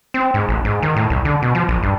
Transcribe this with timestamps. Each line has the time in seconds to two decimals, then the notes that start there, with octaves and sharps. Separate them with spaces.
0.14 C4
0.34 G#2
0.49 A1
0.65 G#2
0.83 D#3
0.96 A2
1.10 C2
1.25 D3
1.42 B2
1.55 F3
1.69 A#1
1.83 G2